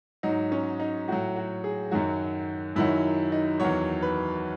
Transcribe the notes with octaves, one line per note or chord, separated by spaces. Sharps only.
G#2 F#3 D#4
C#4
D#4
A2 F#3 F#4
F#4
G#4
F#2 D#3 F#3 F#4
F#2 D#3 F#3 E4
D#4
E2 D#3 F#3 C#5
B4